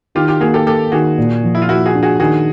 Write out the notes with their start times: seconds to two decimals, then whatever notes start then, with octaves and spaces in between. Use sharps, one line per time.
0.15 D#3 F4 G4
0.28 F4 G4
0.41 A#3 F#4 G#4
0.54 G4 A4
0.67 A#3 G4 A4
0.92 D#3 F#4 G#4
1.18 A#2
1.44 F3
1.55 E4
1.62 F4
1.69 A#3 E4 F#4
1.86 F#4 G#4
1.95 D4
2.02 F#4 G#4
2.19 D#3 F#4 G#4